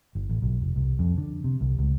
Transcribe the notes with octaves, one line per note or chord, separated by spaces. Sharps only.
G1
A1
B1
F1
C2
F2
D3
C3
C2
C#2